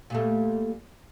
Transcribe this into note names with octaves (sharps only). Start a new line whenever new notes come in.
A#2 G3 A3